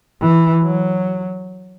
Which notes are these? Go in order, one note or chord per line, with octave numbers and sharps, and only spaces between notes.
E3
F#3